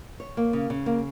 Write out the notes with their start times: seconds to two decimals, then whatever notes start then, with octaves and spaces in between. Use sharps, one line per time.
0.20 C#5
0.37 A#3
0.53 C#3
0.70 C#3
0.86 A#3